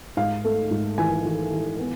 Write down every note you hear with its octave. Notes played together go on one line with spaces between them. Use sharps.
G#2 F5
A3
G#2
E3 G#5
E3
E3
B3